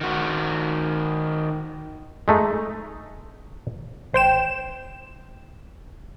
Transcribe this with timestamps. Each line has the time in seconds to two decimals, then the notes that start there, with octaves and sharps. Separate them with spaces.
0.01 D#3 F#4
2.28 G#3 A3 D#4
4.13 A1 C5 G5 E7